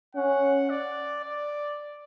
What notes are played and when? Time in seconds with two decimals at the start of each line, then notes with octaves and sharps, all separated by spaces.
0.15 C#4 F#5
0.70 D5
1.24 D5